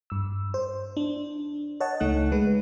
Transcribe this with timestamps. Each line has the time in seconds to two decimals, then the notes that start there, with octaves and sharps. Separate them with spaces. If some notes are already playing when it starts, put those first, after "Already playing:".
0.10 G2 E6
0.54 C5
0.97 D4
1.80 C#5 D#5 F#5 A5
2.00 C#2 A3 D#4 F#6
2.32 G#3 B4